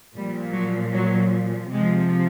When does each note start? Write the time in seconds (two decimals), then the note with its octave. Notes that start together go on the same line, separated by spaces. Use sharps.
0.16 A#2 F3 G3
0.54 F#3
0.94 F#3
1.71 C3 F3 G#3